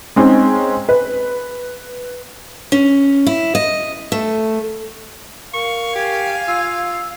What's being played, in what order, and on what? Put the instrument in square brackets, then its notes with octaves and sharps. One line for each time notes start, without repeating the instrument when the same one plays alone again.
[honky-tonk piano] G#3 C4 C#4 D#4
B4
[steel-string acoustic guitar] C#4
E4
D#5
A3
[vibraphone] A#4 [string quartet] F5 [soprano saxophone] C#6
[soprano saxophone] G4 [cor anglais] G#5
[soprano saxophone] F4 [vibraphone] E6